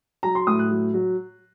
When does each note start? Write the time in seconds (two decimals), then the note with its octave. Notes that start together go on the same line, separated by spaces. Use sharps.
0.23 F#3 A#5
0.35 C6
0.47 A2 D#6
0.59 F#6
0.71 F#3
0.94 F#3